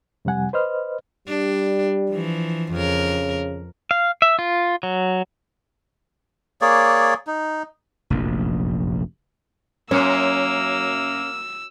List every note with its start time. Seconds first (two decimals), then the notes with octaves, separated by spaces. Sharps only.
0.25 F2 C3 G3 F#5 G#5
0.53 B4 C5 D#5 F6
1.28 G3 D4
2.10 E3 F3
2.72 F2 C#3 A#4
3.91 F5
4.22 E5
4.39 F4
4.83 F#3
6.61 A#3 G#4 C#5 D5
7.27 D#4
8.10 F1 A#1 F#2
9.91 F#2 A#3 C#4 E6